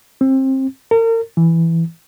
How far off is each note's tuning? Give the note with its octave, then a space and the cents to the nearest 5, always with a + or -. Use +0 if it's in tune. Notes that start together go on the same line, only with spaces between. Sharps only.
C4 +25
A#4 -40
E3 +5